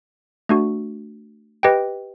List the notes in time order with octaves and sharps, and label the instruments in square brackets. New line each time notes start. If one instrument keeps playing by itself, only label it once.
[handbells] A3 D4 F#4
G4 B4 D#5 G5